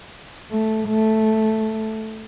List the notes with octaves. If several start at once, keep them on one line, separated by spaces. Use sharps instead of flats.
A3
A3